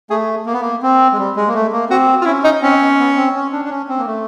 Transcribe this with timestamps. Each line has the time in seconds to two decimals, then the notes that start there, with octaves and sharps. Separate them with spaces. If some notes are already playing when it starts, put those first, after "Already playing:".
0.10 A3 G#4
0.46 A#3
0.53 B3
0.61 A#3
0.82 C4
1.13 G#3
1.19 G3
1.36 G#3
1.47 A#3
1.54 A3
1.72 A#3
1.89 C4 F#4
2.22 F4
2.26 C#4 E4
2.44 D#4
2.62 C4 C#4
2.80 B3
2.99 B3
3.16 C4
3.35 C#4
3.53 D4
3.65 D4
3.70 C#4
3.89 C4
3.98 A#3
4.06 A3